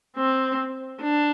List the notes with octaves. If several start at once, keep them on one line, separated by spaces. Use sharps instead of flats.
C4
D4